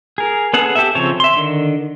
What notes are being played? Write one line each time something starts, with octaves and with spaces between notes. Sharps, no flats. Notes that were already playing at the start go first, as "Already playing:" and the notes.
G#4 A#4
B3 C#4 G#4 A4 F#5
G4 A4 E5
C#3 F3 C4 A4 C#5
E5 C6
D3 D#3